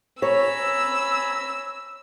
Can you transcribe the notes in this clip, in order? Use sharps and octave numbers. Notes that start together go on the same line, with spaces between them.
C#5 G#5 A#5 B5 E6